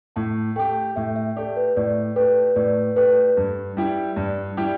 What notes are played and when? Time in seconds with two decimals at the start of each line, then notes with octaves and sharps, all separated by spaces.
0.16 A2 A5
0.56 A3 G4 G5
0.96 A2 E5
1.16 E5
1.36 A3 G4 D5
1.56 B4
1.76 A2 D5
2.16 A3 G4 B4
2.56 A2 D5
2.96 A3 G4 B4
3.37 G2
3.77 G3 E4 G4
4.16 G2 D5
4.57 G3 E4 G4